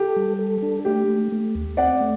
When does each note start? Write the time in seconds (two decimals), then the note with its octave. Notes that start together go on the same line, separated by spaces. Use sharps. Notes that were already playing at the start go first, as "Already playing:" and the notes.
Already playing: G4 A4
0.16 G3
0.39 A4
0.63 D4
0.85 A3 G4
1.08 A3
1.32 A3
1.55 D#2
1.77 C4 D5 F#5
2.00 A3